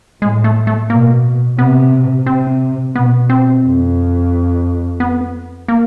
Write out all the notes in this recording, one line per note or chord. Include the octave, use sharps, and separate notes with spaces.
A2 G#3
A3
A3
B2 A#3
C3 B3
C3 C4
B2 B3
C4
F2
B3
A#3